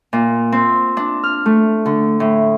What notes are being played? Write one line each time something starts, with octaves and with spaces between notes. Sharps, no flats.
A#2
C4
D4
F6
A3
D3
A2